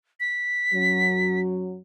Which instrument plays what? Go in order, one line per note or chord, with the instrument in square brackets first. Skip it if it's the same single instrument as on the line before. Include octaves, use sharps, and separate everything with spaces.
[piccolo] B6
[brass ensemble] F#2 F#3